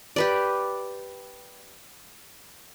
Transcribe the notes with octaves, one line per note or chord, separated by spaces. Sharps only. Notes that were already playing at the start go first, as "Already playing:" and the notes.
G4 B4 D5